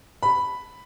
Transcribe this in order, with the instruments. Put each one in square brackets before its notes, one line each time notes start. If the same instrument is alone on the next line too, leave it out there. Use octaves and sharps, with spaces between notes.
[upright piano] B5